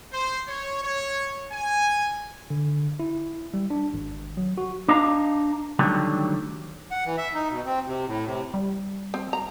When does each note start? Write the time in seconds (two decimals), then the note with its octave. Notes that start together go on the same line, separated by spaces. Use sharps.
0.12 C5
0.47 C#5
0.82 C#5
1.52 G#5
2.50 D3
3.00 E4
3.54 G3
3.70 D4
3.94 G#1
4.37 F#3
4.58 F#4
4.88 D4 D#5 F5 A#5
5.79 D3 D#3 F#3 G3 A3
6.91 F#5
7.05 E3
7.18 E5
7.34 D#4
7.50 B2
7.66 C4
7.86 C3
8.07 A2
8.26 C3
8.54 G3
9.14 C4
9.33 A#5